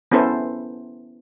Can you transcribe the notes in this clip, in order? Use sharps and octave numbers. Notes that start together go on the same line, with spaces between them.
B3 C#4 E4 A4 C5